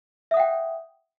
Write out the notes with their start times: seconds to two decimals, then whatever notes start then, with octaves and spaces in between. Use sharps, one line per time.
0.31 E5
0.34 D#6
0.37 F#5
0.40 G5